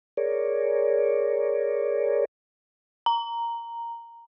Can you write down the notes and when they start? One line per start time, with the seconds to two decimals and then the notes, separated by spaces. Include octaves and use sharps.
0.17 G#4 A#4 C#5 D5
3.06 A#5